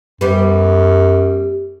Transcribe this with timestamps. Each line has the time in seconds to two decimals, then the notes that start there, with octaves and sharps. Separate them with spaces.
0.21 F#2 G3 B3